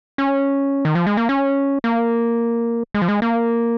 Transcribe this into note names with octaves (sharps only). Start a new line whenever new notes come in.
C#4
D#3
F3
G#3
A#3
C#4
A#3
G#3
F3
G#3
A#3